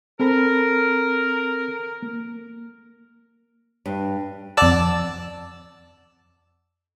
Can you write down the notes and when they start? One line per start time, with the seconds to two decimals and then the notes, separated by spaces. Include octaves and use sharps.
0.20 C4 A4 A#4 B5
2.03 A#3
3.86 G2
4.57 F2 D5 F#5 A5 E6